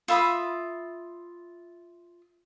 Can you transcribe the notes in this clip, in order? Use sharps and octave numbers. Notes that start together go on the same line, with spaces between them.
F4 E5 B5 D#6